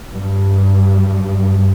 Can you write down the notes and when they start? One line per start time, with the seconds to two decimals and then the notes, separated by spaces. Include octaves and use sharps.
0.13 G2